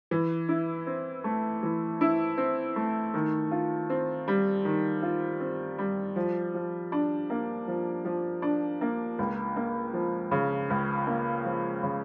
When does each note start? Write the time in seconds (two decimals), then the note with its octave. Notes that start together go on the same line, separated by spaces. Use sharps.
0.11 E3
0.49 E4
0.87 C4
1.24 A3
1.63 E3
2.01 E4
2.38 C4
2.76 A3
3.14 D#3
3.51 F4
3.90 C4
4.28 G3
4.65 D#3
5.03 F4
5.40 C4
5.78 G3
6.16 F3
6.54 F3
6.92 D4
7.30 A#3
7.68 F3
8.05 F3
8.42 D4
8.81 A#3
9.19 C#2
9.56 A#3
9.93 F3
10.31 C#3
10.70 C#2
11.07 A#3
11.45 F3
11.83 C#3